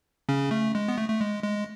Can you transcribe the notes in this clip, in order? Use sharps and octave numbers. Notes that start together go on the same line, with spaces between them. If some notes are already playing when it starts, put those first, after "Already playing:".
C#3 C#4
A3
G#3
B3
A3
A3
G#3
G#3